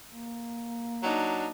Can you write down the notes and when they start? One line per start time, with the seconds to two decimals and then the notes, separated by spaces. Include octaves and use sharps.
0.13 A#3
1.03 F#3 D4 D#4